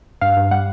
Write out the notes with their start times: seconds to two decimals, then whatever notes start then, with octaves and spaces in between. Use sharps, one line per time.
0.21 G2 F5
0.37 G2
0.51 G3 F#5